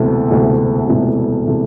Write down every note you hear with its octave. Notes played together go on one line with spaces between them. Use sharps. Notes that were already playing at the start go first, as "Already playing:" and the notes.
Already playing: E1 D2 C3 E3 A3
E1 D2 C3 E3 A3
E1 D2 C3 E3 A3
C3 E3 A3